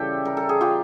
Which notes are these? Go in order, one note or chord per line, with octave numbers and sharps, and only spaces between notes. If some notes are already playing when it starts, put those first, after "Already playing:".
Already playing: C#3 E3 G3 G4 A4
A#4
A4
G#4
F4 G4